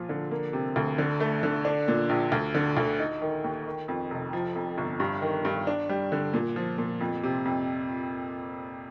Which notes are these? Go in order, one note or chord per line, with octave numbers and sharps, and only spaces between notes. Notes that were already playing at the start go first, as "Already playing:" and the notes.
Already playing: A#2 F3 F4
D3
A#3
C3
D2
D3
A3
D3
D4
A#2
A#1
D2
D3
D2
D#4
D#3
D#2
D#3
F2
F1
F3
F2
G1
G2
D#3
G2
D4
G3
D3
A#2
F3
A#2
F2
C3
F2